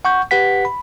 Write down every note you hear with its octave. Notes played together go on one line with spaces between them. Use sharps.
F#5 C#6 G6
G4 B4 F#5 B6
B5